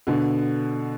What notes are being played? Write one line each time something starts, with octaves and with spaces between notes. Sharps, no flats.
B2 D3